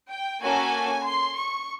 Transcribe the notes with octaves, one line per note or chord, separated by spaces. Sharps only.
G5
A#3 C#4 F#4 A4 G#5
C6
C#6